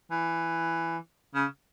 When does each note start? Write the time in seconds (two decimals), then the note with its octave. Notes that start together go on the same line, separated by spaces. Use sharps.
0.11 E3
1.35 C#3